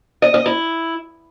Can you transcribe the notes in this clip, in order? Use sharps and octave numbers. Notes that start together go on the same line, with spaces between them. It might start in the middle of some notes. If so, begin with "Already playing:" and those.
D#5
D#5
E4